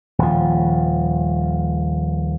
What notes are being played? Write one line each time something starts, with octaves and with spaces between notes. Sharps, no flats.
D#1 F3